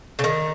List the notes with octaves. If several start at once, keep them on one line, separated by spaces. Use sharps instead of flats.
C#3
D#3